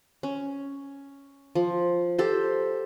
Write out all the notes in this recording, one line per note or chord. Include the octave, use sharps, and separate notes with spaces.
C#4
F3
G4 A4 C5